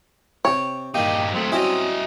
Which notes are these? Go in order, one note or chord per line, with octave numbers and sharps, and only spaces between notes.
C3 C#5 G5
G2 D#3 A#3 D#4 G4
F#3 A3 C4
F#3 G3 C#4 E4 D#5